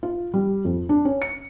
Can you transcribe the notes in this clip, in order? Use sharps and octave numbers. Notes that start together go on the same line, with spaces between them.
F4
G3
F2
D4
C#4
C#7